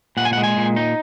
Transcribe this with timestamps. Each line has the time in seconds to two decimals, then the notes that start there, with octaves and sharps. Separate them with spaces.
0.17 A#2 F#5
0.25 G#5
0.33 F#5
0.37 G#3
0.43 G#5
0.57 A#2
0.76 D#4